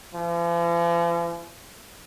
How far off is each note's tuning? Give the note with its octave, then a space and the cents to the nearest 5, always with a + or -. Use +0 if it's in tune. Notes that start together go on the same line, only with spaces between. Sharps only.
F3 -45